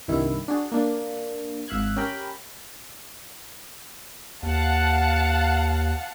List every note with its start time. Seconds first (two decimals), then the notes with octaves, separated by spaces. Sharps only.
0.08 C2 G2 D#3 E4
0.48 D4 F#4 G#4
0.72 A#3 D4
1.68 G#1 E5 F5 F#6 G#6
1.96 C#4 G4 A#4 G5 B5
4.43 D#2 F5 F#5 A5